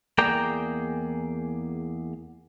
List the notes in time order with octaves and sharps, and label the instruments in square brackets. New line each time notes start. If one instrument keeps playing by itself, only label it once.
[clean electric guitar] E2 A#3 G#4 D5 G5 A#5